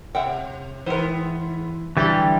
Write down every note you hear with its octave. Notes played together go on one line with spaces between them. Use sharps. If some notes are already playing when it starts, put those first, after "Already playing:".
C3 E5 F#5 G5
G#2 E3 B3 A#4 C5
D3 E3 F#3 G3 G4 A4